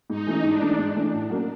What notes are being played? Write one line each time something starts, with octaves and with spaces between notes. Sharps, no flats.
G#2 D#4
E3 A3 C#4
G#2 D4
E3 A3 C#4
G#2
E3 A3 C#4
A2
F#3 A#3 C#4